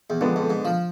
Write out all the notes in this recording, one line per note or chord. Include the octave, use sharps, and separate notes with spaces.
E2
F2 D3 G#3 B3 D4
F2
G#2
F3